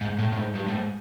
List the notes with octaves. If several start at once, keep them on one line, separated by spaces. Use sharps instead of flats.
G#2
A2
A2
G#2
G2
A2
G#2